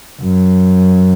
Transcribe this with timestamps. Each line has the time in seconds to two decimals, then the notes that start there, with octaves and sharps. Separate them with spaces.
0.22 F#2